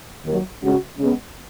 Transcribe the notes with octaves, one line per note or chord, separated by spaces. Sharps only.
D#2 D#3 F#3
C#3 G#3 C#4 F#4
C#3 G#3 B3